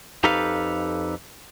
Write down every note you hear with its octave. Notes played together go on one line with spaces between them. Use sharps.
F2 D#4 G4 A4 B4 F5